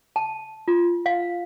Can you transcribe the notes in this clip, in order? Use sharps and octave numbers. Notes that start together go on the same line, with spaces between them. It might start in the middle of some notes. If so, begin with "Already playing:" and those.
A5
F4
F5